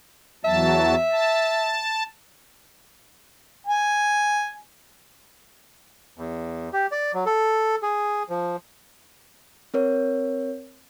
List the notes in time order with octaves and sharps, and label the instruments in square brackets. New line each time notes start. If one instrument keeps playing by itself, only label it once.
[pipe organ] E2 F#3 A5 [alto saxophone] E5
[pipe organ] A5
[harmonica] G#5
[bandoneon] E2
G4
D5
F#3
A4
G#4
F3
[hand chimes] C4 A#4 C#5